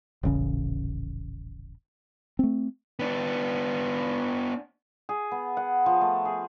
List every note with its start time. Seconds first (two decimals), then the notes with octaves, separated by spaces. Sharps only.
0.23 D#1 A1 C#3
2.39 A3 C4
2.99 B3 D4
5.09 G#4
5.32 B3
5.57 F#5
5.86 F3
6.01 A3
6.25 G#4